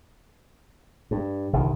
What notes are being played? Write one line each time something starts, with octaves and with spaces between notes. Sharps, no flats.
G2
G1 C2 D#3